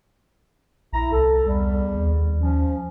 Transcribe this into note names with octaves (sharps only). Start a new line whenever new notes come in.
A#1 E4 A#5
C2 A4
E2 G3
D#2
F3 C#4